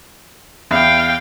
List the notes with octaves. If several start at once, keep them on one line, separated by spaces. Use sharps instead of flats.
E2 F5 G5